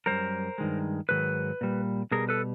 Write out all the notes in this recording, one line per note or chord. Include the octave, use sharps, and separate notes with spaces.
F#2 D#3 G3 A#4 C5
G2 D#3 G#3
G#2 D#3 F#3 B4
A#2 G3
B2 G3 G#4 A#4
A4 B4